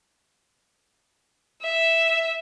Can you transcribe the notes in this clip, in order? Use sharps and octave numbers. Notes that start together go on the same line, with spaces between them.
E5